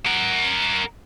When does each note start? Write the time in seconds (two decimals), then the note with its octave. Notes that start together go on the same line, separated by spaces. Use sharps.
0.06 A#4 F#5